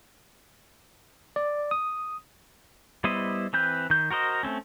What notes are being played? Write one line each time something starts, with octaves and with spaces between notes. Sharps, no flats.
D5
D#6
G3 B3 E4 C5 D#5
E3 C4 B4 G6
D#3 G6
F#4 A#4 C5 D#5
A3 C4 C#4